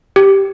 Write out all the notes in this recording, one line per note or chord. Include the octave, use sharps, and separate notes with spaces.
G4